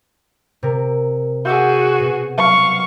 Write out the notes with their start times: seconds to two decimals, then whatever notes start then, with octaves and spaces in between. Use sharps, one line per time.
0.63 C3 A#4
1.45 F#4 G#4 F#5 E6 G6
2.00 B2
2.37 F#3 F5 C#6